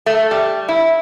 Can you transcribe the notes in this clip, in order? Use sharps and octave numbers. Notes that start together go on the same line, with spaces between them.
A3
G3
E4